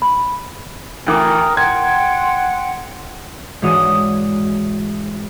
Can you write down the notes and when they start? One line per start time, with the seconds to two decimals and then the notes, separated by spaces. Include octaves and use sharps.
0.02 B5
1.07 D2 E3 A#4 G5 D6 D#6
1.57 F#5 G5 C6 G#6
3.62 G#2 E3 D4 F#4 C#5 D#6